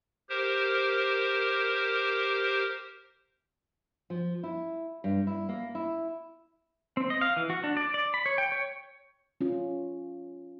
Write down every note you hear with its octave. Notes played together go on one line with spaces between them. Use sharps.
G4 A#4 C5
F3
E4
G2
E4
A#3
E4
C4
D#5
F5
E3
F#4
D4
D5
D5
B5
C#5
G5
C#5
C#4 F4